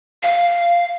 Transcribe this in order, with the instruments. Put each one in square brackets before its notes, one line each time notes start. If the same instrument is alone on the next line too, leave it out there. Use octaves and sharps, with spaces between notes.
[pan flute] F5